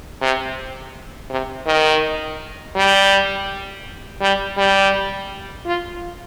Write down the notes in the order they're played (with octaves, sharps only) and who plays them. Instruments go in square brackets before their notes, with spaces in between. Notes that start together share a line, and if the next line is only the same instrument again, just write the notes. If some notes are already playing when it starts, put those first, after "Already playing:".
[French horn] C3
C3
D#3
G3
G3
G3
F4